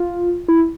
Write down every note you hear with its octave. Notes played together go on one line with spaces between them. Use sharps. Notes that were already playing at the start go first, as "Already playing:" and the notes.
Already playing: F4
E4